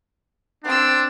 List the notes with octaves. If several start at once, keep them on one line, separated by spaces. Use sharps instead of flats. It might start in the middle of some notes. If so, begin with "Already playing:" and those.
C4 D4 E6